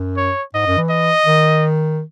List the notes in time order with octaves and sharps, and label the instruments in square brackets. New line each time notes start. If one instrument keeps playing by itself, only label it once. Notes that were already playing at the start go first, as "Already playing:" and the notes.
Already playing: [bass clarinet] F#2
[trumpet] C#5
[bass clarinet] G#2 [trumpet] D#5
[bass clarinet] F#2
E3
[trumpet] D#5
[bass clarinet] D#3